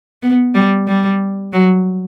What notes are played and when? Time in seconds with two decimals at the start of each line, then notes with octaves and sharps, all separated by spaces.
0.23 B3
0.54 G3
0.87 G3
1.53 F#3